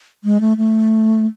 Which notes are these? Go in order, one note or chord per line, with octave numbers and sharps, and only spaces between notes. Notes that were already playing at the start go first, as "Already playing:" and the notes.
G#3
A3
A3